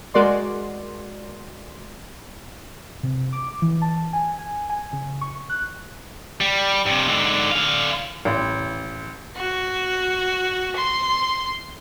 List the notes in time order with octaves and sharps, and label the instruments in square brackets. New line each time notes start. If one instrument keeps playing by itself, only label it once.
[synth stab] G#3 F#4 A#4 D5 C6
[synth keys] C3
D6
E3
A5
G#5
G#5
G#5
C#3
C#6
F#6
[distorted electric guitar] G3
G2 C3
G#2 D3
D3 F5
[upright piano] A1
[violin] F#4
C6